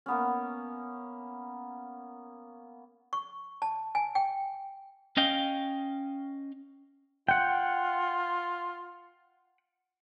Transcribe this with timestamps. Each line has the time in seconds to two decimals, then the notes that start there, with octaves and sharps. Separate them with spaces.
0.06 A#3 B3 C#4
3.13 C#6
3.62 A5
3.95 G#5
4.15 G5
5.17 C#4 D#5 F5 G5
7.29 F4 F#5 G5